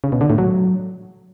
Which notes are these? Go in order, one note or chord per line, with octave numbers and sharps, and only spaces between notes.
C#3
B2
D3
A2
F#3